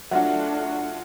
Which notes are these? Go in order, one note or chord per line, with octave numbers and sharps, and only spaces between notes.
F#3 A3 D4 F4 F#4 E5 F#5